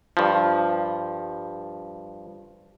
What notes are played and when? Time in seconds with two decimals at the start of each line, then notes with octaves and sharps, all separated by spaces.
0.17 G2 F3